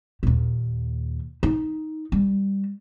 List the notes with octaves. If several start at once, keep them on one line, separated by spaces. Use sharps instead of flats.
D#2 A#2
D#4
G3